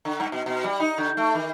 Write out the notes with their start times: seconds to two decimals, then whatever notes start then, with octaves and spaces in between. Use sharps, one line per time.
0.05 D3
0.20 G2
0.32 B2
0.46 B2
0.64 G3
0.80 D#4
0.98 D3
1.17 A3
1.35 D#3